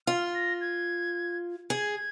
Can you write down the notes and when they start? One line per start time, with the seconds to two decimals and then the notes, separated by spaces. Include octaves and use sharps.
0.07 F4 F6
0.34 A#6
0.61 G#6
1.70 G#4 G#6